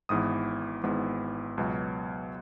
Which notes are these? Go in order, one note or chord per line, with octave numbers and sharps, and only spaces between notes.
G#1 G#2 E3 B3 D#6
G#1 G#2 E3 B3
C#2 B2 F#3